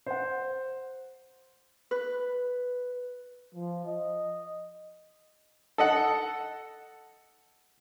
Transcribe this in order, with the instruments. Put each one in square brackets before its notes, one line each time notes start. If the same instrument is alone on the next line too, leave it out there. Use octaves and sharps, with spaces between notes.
[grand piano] C5 F#5
[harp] B4
[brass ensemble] F3
D#5
[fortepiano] A4 D#5 F#5